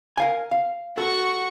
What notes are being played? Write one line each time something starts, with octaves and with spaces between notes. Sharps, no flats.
A#4 F5 G#5
F5
F#4 A4 F#5 C#6